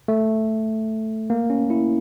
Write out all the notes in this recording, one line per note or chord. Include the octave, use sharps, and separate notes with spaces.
A3
A#3
C#4
E4